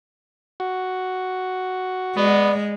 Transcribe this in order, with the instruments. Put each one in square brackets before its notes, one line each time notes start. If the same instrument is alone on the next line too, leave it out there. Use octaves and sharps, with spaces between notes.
[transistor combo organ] F#4
[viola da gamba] G#3 [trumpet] B3 [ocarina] D5